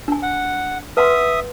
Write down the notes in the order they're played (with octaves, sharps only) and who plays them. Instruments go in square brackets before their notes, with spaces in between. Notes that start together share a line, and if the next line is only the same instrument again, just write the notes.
[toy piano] D4 G#5
[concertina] F#5
[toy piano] B4 F#5 C6 [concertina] E5 D#6